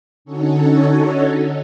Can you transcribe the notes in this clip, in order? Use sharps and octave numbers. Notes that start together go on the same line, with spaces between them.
D3 C#4 D#4 F#4 A4 C#5